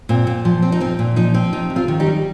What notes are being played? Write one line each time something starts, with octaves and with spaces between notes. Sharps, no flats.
A#2 C4
A#2
F3
C4
D#4
A#2 C4
A#2
F3 D#4
C4
C3 D#4
C3
C4 F4
D#3
D#4 G4
G3